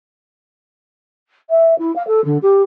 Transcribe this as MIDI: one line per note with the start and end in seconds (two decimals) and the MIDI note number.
1.50 1.77 76
1.79 1.94 64
1.96 2.05 77
2.07 2.23 69
2.25 2.38 50
2.42 2.62 67